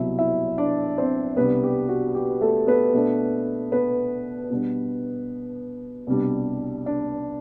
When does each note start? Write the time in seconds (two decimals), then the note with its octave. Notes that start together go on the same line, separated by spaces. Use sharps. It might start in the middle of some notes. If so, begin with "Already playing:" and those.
Already playing: C2 B2 F#3 E4 E5
0.19 E4 E5
0.58 D4 D5
0.98 C4 C5
1.36 C2 B2 G3 B3 D4 B4
1.63 G4
1.89 F#4
2.15 G4
2.41 A3 A4
2.67 B3 B4
2.93 B2 A3 D4
3.72 B3 B4
4.50 B2 G3 B3 D4
6.07 C2 B2 G3 D4
6.86 D4 D5